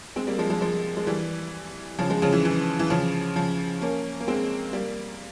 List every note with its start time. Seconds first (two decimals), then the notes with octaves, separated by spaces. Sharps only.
0.16 G#3 C4
0.27 G3 A#3
0.39 F3 G#3
0.50 F3 G#3
0.61 F3 G#3
0.97 G#3
1.07 E3 G3
1.99 C#3 F3
2.10 F3 G#3
2.22 C#3 F3
2.33 E3
2.45 E3
2.79 E3
2.90 C#3 F3
3.36 C#3 F3
3.82 A#3 C#4
4.20 A#3
4.28 G#3 C4
4.73 G3 A#3